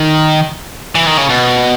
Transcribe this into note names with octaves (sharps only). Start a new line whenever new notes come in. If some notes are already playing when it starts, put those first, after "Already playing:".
Already playing: D#3
E3
D#3
C#3
B2